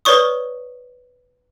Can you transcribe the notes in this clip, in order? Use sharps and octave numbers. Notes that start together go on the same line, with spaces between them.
B4 C#5 D5 C#6 D#6